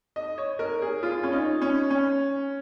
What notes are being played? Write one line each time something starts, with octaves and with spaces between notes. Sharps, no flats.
D#5
C#5
A#4
G#4
F4
C#4
D#4
C#4
C#4